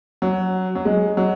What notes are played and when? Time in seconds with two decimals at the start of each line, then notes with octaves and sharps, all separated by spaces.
0.22 F#3
0.75 F#3
0.85 G#3
1.17 F#3